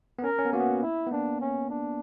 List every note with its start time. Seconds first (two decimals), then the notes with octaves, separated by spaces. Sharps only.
0.19 B3
0.23 C#4 A#4
0.39 C#4
0.45 B3
0.53 A#3 F#4
0.60 B3
0.82 E4
1.07 B3
1.11 A#3 D4
1.41 C#4
1.70 D4